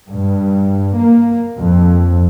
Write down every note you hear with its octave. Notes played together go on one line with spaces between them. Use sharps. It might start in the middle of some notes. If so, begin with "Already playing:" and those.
G2
A#3
F2